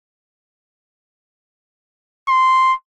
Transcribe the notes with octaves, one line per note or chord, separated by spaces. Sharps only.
C6